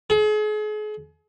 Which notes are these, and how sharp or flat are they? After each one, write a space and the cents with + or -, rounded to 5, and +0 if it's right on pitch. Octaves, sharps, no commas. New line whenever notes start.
G#4 +40